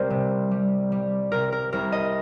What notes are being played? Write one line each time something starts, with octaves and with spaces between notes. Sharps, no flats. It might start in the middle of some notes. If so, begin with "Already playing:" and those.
Already playing: C2 G3 C4 A#4 C5
C3
G3
G3
C3 A#4
A#4
C2 A#4
D#5